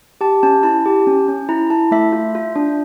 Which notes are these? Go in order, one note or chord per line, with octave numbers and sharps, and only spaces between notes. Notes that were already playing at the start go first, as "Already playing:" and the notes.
G4 A5
C#4 A5
E4 A5
G4
C#4
C#4
E4 A#5
E4 A5
A3 E5
F4
F4
D4